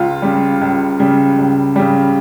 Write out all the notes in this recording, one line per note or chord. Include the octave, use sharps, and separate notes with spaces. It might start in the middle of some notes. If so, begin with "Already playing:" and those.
Already playing: C#2 F4
C#3 G3
C#2
C#3 G3
C#2
C#3 G3